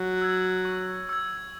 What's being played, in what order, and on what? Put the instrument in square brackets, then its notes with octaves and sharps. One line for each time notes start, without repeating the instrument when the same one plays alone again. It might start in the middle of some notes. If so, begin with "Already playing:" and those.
Already playing: [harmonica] F#3
[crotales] E6 G#6
C#6
E6 G#6